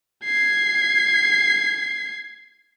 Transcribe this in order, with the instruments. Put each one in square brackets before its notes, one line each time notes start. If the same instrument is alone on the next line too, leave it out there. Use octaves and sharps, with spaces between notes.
[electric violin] G#6 C7